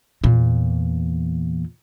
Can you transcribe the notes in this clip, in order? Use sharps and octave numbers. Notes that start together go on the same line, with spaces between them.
E2 A#2